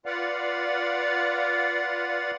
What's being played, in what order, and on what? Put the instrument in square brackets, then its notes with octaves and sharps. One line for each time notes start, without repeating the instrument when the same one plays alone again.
[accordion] F4 B4 D5 F5 F#5